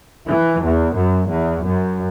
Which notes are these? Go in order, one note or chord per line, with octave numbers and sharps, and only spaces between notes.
E3
E2
F#2
E2
F#2